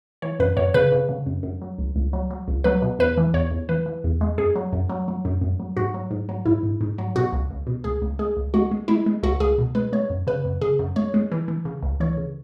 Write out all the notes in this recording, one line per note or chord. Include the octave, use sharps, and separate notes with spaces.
E3 C#5
F#2 B4
F#2 C#5
C#3 B4
C#3
C#3
F#2
F#2
F#3
C#2
C#2
F#3
F#3
C#2
F#3 B4
B2
E2 B4
E3
E2 C#5
E2
E3 B4
E3
E2
G#3
F#2 G#4
F#3
F#2
F#3
F#3
F#2
F#2
F#3
G#2 F#4
F#3
G#2
F#3
G#2 E4
G#2
G#2
F#3
B2 F#4
C#2
C#2
B2
C#2 G#4
C#2
G#3 G#4
C#2
G#3 F#4
G#3
G#3 E4
G#3
C#2 F#4
C#2 G#4
B2
G#3 B4
G#3 C#5
F#2
C#3 B4
F#2
C#3 G#4
F#2
G#3 C#5
G#3
E3
E3
C#3
C#2
E3 C#5
C#3